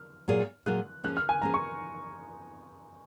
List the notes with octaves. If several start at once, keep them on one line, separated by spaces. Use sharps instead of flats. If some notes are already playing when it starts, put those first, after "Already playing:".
Already playing: F6
A#2 F#3 A#3 F4 G#4
A#2 F#3 A#3 F4 G#4 F#6
F3 A#3 C#4 G#4 F#6
F6
G#5
F3 A#3 C#4 G#4 A#5
C#6